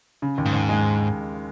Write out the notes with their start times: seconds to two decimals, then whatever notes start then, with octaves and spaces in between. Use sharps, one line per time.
0.22 C#3
0.38 D#2
0.46 G#2
0.53 D#2
0.69 G#3